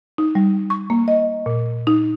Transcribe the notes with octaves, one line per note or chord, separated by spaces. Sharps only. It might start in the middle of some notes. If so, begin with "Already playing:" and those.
D#4
G3
C#6
A#3
D#5
A#2
D#4